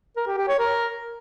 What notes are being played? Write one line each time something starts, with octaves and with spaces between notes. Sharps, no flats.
A#4
G4
G4
C#5
A#4